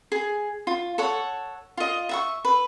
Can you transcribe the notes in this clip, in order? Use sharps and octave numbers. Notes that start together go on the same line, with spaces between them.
G#4
F4
A4 C#5 F#5
F4 D#5
E5 F#5 C#6
B4